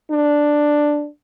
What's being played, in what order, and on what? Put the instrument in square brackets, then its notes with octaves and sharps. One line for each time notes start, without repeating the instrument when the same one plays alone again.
[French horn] D4